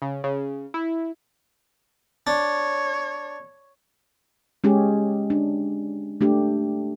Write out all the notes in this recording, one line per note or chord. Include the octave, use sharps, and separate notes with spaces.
C#3
C#3
E4
D4 C#5
G#3 C#4 G4 G#4
D4
A3 D4 G4